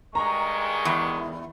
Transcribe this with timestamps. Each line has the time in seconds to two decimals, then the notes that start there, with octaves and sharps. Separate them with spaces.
0.15 G2 D#3 G#3 A#5 C#6
0.85 E2